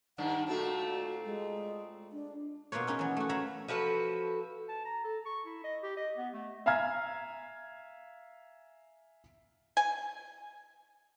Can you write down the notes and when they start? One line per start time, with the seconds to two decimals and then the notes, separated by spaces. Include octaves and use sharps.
0.18 G2 D#3 D4 F#5
0.48 A#2 A3 C4 F#4
1.25 G#3
2.12 D4
2.72 B2 A#3 F4 B4 C#5
2.87 C#4 D#4 G#4 B4
2.99 E3 F#3
3.17 A3 F#4
3.29 C#5 E5 F5 A#5 B5
3.68 F3 F#4 A4 B4
4.69 A5
4.85 A#5
5.04 A4
5.26 C#6
5.46 E4
5.64 D#5
5.83 G4
5.97 D#5
6.17 B3
6.34 A3
6.66 E5 F5 G#5 A#5 F6 G#6
9.77 G#5